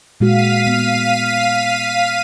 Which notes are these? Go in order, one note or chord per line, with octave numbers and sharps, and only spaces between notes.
A#2 G#3 F#4 F5 B6 D#7
B3